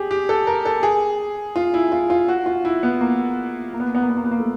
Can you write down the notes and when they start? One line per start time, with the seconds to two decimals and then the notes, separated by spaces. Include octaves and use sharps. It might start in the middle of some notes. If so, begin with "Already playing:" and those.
Already playing: G4 G#4
0.11 G4
0.29 A4
0.47 A#4
0.65 A4
0.83 G#4
1.56 F4
1.74 E4
1.92 F4
2.10 F4
2.28 F#4
2.46 F4
2.65 E4
2.83 B3
3.01 A#3
3.73 A#3
3.80 B3
3.88 A#3
3.95 B3
4.02 A#3
4.09 B3
4.17 A#3
4.24 B3
4.31 A#3
4.40 A3